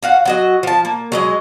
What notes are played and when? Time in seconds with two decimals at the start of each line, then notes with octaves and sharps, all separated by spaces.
0.03 F#4 F5 F#5
0.25 F#3 F#4 D#5
0.63 F3 A5
0.85 A#3
1.12 F#3 G#3 D#5